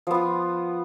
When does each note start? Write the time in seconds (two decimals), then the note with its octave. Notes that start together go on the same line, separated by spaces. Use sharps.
0.07 F3
0.11 B3
0.14 F4